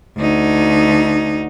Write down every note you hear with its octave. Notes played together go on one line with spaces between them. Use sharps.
D2 D#4